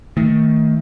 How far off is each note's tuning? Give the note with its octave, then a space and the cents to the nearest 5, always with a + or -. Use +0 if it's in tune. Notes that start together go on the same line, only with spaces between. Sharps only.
D#3 +20 A3 +15